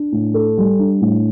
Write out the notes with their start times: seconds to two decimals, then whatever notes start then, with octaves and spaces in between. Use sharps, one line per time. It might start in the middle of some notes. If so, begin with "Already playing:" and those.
Already playing: D4
0.12 A2
0.34 A4
0.58 G3
0.79 D4
1.01 A2